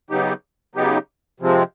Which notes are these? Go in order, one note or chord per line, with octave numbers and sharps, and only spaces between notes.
C#3 F#3 B3 D#4 G4
C#3 F#3 B3 D#4 G4
C3 F3 G#3 C4